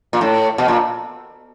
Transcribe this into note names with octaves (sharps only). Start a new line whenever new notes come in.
A#2
A2
B2
A#2